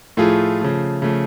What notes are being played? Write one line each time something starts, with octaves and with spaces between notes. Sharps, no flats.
A2 F3 A3 F4 G#4
C#3 F3 A3
C#3 F3 A3